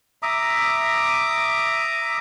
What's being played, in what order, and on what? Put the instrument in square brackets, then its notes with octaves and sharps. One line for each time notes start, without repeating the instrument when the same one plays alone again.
[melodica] E5 A#5 D6 D#6